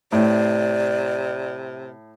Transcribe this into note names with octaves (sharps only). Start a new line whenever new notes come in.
A2 C3 D5